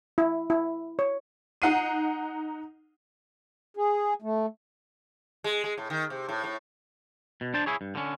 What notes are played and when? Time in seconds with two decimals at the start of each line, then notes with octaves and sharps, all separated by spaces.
0.18 E4
0.50 E4
0.99 C#5
1.62 D#4 F#5 C7 D#7
3.77 G#4
4.22 A3
5.44 G#3
5.64 G#3
5.78 A2
5.90 D#3
6.10 C3
6.29 A2
6.44 A2
7.41 B2
7.54 D4 C5 A5
7.66 E4 G#4 C#5
7.81 G2
7.95 D3 C#4